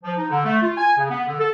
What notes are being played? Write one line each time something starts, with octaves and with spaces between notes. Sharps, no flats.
F3
D#4
D3
A3
F4
G#5
C#3
B3
D3
A4